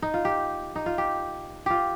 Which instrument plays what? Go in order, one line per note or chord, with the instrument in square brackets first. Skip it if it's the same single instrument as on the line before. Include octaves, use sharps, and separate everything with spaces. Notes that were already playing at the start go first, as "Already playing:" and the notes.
[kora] D#4
F4
G4
D#4
F4
G4
F4 G4